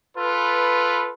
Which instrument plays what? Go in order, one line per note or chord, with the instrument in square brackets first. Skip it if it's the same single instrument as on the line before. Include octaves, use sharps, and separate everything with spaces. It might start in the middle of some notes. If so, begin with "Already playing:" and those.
[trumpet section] F4 A4 B4